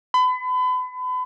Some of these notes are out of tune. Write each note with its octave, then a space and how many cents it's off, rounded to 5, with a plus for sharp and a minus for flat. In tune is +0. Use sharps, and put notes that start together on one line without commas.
B5 +35